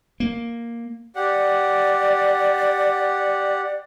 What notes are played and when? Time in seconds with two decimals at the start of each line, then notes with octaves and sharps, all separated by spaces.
0.20 A#3
1.16 G4 D5 F#5